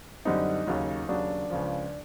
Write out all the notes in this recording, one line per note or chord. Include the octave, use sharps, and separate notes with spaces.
F#2 D3 G3 C4 D#4
D#2 C#3 F#3
D#2 C#3 F#3 D4
C#2 C#3 F3